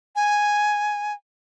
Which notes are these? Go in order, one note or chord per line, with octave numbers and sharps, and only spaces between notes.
G#5